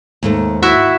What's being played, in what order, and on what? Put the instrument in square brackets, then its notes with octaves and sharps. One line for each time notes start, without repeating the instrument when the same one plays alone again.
[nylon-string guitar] D#2 G#2 A3
[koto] E4 F#4 E5